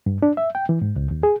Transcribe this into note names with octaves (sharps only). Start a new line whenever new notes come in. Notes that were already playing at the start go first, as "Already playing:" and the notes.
G2
D4
E5
G5
E3
G#2
C#2
D#2
G#4